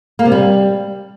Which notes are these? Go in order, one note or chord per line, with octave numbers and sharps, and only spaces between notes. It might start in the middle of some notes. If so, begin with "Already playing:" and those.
A#3
C3
G3